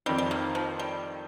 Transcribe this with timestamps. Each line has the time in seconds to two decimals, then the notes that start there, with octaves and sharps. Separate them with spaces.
0.06 F2 D#3 G3 C4 D#4
0.18 G3
0.31 A#3
0.55 F3
0.79 G3